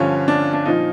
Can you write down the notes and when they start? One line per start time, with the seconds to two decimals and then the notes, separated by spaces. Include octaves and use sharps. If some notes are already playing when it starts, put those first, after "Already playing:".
Already playing: G2 D3 F3 C#4
0.28 D4
0.53 D4
0.66 A#2 F3 D#4